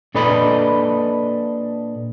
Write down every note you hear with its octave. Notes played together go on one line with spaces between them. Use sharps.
A#2 D4 A4 B4 D#5 B5